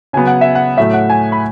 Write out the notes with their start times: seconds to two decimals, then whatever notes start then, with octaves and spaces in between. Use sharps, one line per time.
0.13 C#3 F#3 B3 G#5
0.27 F#5
0.41 E5
0.55 F#5
0.77 A2 F#3 A3 E5
0.93 F#5
1.10 G#5
1.32 B5